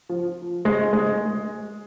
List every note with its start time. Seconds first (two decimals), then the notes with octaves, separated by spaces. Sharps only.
0.09 F3
0.65 G#3
0.93 G#3